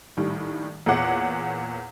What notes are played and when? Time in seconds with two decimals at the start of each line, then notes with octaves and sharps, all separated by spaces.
0.17 A#1 A2 D#3 G3
0.86 E2 A#2 G#4 C#5 F#5 D6